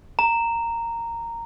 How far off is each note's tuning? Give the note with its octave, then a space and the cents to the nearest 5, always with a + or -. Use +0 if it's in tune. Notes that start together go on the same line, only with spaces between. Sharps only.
A#5 -10